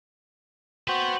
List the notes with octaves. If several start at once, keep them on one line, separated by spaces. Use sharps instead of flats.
F#4 B4 C5 F#5 G5